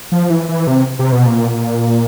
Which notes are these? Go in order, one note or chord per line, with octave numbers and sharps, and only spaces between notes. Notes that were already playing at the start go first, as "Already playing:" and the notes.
F3
E3
E3
C3
C3
B2
A#2